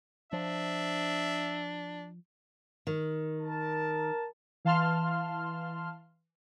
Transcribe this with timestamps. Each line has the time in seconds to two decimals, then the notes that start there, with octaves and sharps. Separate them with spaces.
0.33 F3 D4 E5
2.87 D#3
3.42 A#4 A5
4.65 E3 F5 A5 C6 F6